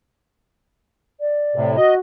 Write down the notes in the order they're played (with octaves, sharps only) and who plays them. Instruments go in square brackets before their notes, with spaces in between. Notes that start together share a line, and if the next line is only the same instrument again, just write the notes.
[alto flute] D5
[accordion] A2 C3
[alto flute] F#4 [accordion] D#5